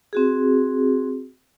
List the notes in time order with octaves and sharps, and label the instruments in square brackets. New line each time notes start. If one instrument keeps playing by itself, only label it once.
[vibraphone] C4 F#4 G#4